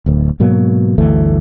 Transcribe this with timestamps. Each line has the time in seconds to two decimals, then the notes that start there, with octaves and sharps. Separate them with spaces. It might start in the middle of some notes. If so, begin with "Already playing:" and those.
0.06 D1 D2
0.40 G#2 B2 F#3 A#3
0.98 G1 D2 E3 A3